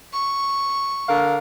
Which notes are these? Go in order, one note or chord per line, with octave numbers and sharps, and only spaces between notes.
C#6
D3 A#4 F5